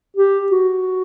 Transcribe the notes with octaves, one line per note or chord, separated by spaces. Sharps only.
G4
F#4